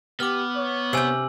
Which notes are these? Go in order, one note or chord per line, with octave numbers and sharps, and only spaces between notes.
B3 G4 D6 F6
C#5
C3 G5 G#5 E6 F#7